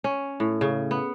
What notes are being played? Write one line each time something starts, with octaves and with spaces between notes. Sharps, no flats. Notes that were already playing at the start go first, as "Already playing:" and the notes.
C#4
A2
C#3
B3